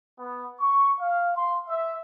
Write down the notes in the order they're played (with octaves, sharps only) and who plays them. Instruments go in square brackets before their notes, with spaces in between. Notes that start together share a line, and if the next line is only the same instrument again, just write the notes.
[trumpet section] B3
C#6
F5
C6
E5